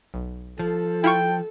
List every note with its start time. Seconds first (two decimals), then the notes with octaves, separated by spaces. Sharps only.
0.14 B1
0.59 F3 A4
1.04 E4 F4 G5 C#6